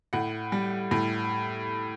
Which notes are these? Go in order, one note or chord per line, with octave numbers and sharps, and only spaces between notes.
A2 F#5
G3
A2